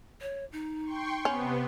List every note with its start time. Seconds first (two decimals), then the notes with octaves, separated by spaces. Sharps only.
0.21 C#5
0.52 D#4
0.83 G5 C6 C#6
1.25 C3 B3 C#4